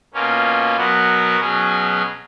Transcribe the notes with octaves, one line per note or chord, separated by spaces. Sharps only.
B2 A#3 C#4 F4
B2 F#3 B3 F#4 A#4
B2 F#3 C#4 G#4